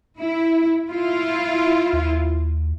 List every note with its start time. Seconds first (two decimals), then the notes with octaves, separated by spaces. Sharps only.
0.19 E4
0.90 E4 F4
1.93 D#2